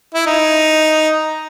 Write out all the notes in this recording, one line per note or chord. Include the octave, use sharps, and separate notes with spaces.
E4
D#4